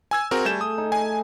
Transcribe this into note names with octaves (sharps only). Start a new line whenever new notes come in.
G#5 E6 G#6
C4 F#4 G#4 A#4
G3 A3 G#5 G6 E7
D#6
D#4
E5 G#5